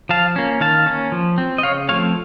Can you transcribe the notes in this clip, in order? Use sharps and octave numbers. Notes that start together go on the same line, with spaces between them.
F3 F5 A5
A#3 C#4
D#3 F5 A5
A#3 C#4
F3
C4
D#5
C#3 C#5 F5
F3 A3 C4 C#5 F5